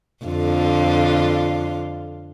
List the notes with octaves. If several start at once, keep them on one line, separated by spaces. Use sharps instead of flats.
F2 D3 F4